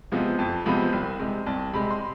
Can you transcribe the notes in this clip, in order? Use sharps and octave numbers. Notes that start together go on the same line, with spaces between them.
C3 F3 G#3 B3
F2 A5
C3 F3 G#3 B3 B5
C2
C3 G#3
C2 A5
C3 G#3 B5
C6